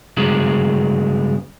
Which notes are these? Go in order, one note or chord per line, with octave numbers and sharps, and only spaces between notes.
G2 C#3 F#3 G#3